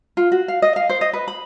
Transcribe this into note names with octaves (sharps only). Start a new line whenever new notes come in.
F4
F#4
F5
D#5
F5
C5
D#5
B4
B5